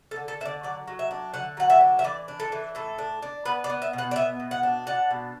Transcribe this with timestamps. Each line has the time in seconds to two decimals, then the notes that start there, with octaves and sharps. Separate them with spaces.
0.11 A4
0.16 D3
0.28 A4
0.41 D3 E5
0.45 D5
0.63 F#3 D5
0.88 F#3
0.99 E5
1.11 D4
1.34 D3 F#5
1.57 F#3 F#5
1.70 E5
1.81 D4
1.99 E5
2.04 E3 D5
2.28 D4
2.40 A4
2.52 E3
2.75 A2 A4
2.99 D4
3.22 D4
3.46 B3 B4
3.64 D5
3.70 B3
3.82 E5
3.93 B2
3.98 F#5
4.11 D5
4.16 B3 E5
4.40 B2
4.51 F#5
4.63 D4
4.87 D4 F#5
5.11 B2